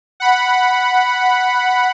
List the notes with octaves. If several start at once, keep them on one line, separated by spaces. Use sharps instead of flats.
F#5 B5